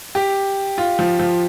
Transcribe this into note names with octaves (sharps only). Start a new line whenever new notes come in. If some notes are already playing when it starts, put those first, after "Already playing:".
G4
F4
F3
F3